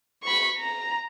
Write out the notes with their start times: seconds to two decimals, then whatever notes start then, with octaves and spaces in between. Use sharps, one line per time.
0.23 B5 C#6
0.58 A#5